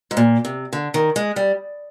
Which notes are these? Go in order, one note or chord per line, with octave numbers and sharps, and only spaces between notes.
G#2
A#2
C3
D3
D#3
G#3
G3